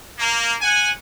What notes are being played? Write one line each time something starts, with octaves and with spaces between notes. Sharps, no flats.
A#3
F#5 G#5